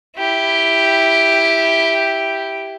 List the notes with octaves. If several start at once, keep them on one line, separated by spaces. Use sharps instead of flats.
E4 G4